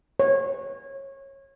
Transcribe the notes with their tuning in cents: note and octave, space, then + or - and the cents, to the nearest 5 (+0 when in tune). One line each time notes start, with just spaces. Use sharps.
C#5 -25